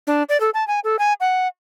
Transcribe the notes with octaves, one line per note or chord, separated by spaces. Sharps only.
D4
D5
A4
A5
G#5
A4
G#5
F#5